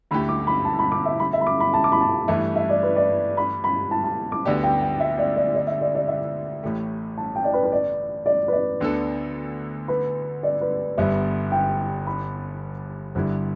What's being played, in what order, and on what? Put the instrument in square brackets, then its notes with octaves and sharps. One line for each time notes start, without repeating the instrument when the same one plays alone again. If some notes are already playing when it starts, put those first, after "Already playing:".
[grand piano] D2 D3 A3 E4 G4 [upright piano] B5
[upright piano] D6
B5
A5
B5
D6
E5
B5
E5
B5
D6
B5
A5
D6
B5
A5
[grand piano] G2 E3 A3 [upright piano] E5
[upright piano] E5
D5
B4
D5
B5
B5
A5
A5
D6
[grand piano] D2 D3 B3 G4 [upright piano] D5
[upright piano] G5
G5
E5
D5
D5
D5
E5
D5
D5
E5
[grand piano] A1 A2 A3 G4
[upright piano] A5
G5
D5
B4
B4
D5
D5
B4
D5
[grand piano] D2 D3 B3 D4 A4
[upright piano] B4
D5
B4
[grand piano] G1 G2 G3 B3 [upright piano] E5
[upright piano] G5
B5
[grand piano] G1 G2 D3 G3 E4